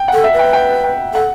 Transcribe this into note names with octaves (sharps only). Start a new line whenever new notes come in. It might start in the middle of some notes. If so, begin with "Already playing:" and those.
Already playing: G5
F#5
A4
E5
B4
G5
G5
G5
A4 F#5